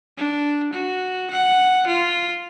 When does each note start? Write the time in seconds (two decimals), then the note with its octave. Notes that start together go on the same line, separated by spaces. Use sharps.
0.18 D4
0.73 F#4
1.31 F#5
1.87 F4